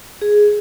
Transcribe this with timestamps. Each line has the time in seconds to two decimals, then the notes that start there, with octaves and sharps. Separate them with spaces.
0.22 G#4